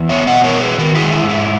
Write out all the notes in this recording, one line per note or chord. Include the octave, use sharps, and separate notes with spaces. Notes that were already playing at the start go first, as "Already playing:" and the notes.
Already playing: E2
B3 C#5 E5
D#5 F#5
B2
A#4 C#5
F#3
G#4 B4
D#3 F#4 A#4
E4 G#4
G#3
E4
G#2
E4